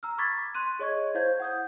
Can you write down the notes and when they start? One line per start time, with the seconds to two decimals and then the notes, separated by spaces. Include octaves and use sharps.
0.03 A#5 E6 F6
0.18 B5 C#6 D6 G#6 A6 B6
0.55 C6 F#6 D#7
0.79 G#4 C#5 D#5 C#6 G#6
1.15 E4 C5 F5 G6 G#6
1.40 F#5 D#6 G6